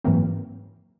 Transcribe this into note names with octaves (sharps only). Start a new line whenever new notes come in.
G#2 E3 F#3 A#3 C4